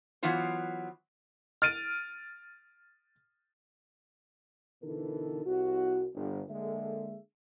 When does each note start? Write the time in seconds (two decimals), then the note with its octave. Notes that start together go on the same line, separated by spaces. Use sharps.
0.23 E3 F#3 B3 F4 C5
1.62 F6 A6 D7 D#7
4.82 B2 D3 E3 D#4 A4 A#4
5.45 C2 F#4
6.15 G1
6.48 D3 G#3 A#3 G#4 A4 E5